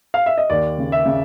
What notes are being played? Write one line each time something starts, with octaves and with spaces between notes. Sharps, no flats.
F5
E5
D#5
D#2 D5
C#3
E5
C#3